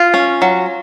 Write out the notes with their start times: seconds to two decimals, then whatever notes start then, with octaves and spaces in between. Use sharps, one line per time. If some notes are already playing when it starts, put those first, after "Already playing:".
Already playing: F4
0.14 C#4
0.42 F#3